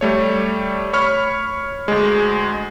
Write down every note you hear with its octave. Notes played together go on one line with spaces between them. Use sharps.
G3 A3 C#5
C#5 B5 C#6 F6
D2 G#3